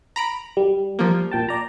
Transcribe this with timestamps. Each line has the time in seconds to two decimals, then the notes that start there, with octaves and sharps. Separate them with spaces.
0.16 A#5 B5 D7
0.57 G3
0.99 F3 A#3
1.32 A#2 G5 A5
1.49 D5 A#5